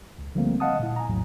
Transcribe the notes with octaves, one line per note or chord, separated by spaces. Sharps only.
C#2
D3 F3 G3 A3 A#3 C4
D#5 F5 F#5 A5 D#6
A#2 E4
G#5 A#5
A#1 E2 A2 F#3